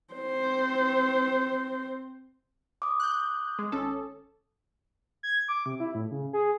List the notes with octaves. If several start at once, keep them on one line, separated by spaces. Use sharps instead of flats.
C4 C5
D6 D#6
F#6 G6
G#3
G#1 C#4 A4
G#6
D6
C3
E4
A2
C#3
G#4